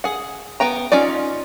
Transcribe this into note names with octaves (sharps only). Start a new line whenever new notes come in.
G#4 F#5
B3 G5 A#5
C#4 D#4 F4 D5